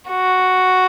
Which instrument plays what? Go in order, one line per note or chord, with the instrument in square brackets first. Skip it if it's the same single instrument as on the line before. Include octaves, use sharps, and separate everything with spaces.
[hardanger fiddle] F#4